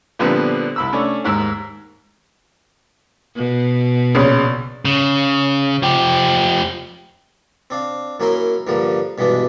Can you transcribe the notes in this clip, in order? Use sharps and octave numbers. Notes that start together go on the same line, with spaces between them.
A#2 D3 F3 G3 B3 C4
C2 B5 E6
A3 C#4 D4
D#2 G#2 A#4 E6
B2
A#1 C#3
C#3
F3 G4
C4 D4 F5
F#2 A#3 C#4 E4 A#4 C6
G2 D3 F3 G3 A#3
G2 B2 E3 G#3 D4